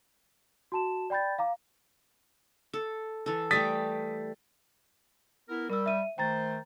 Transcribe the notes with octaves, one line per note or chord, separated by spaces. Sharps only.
F#4 A5 E7
D5 G5 B5 G6 A6
F5 A#5 D6
A4
E3 A4
G3 A3 G4 D#6 A6 B6
B3 E4 A#4
G3 A#4 E6
E5 D#7
D#3 A3 C5 G5 A#5 A6